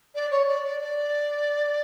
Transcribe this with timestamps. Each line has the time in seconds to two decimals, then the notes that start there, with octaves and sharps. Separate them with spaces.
0.15 D5
0.31 C#5
0.48 D5
0.64 D5
0.81 D5